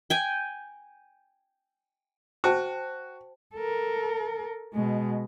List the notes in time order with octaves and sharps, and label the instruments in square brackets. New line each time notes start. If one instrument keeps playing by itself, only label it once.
[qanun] G5 G#5
[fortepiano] F#4 [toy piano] C5 G5 A5
[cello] A4 A#4
B2 G#3